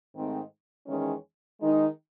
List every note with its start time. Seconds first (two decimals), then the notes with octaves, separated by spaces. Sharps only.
0.14 G#2 D#3 A3 C4 D#4
0.87 E2 D#3 G#3 C#4
1.60 D#3 G#3 D#4